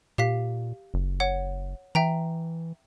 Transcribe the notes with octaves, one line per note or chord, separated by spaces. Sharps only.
A#2 G4 F5 B6
F#1
C#5 F#5
E3 E5 G5 A#5